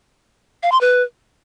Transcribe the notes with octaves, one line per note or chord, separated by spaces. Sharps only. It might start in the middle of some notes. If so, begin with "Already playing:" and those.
F5
C6
B4